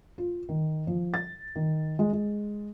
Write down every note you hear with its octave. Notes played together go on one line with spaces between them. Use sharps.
F4
D#3
F3
A6
D#3
G#3
G#3